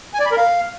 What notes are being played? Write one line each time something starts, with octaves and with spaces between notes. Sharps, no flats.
G#5
D5
B5
A#4
F5